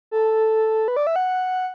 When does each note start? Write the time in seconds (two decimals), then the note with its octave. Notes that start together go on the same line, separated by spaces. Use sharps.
0.11 A4
0.88 B4
0.96 D5
1.07 E5
1.16 F#5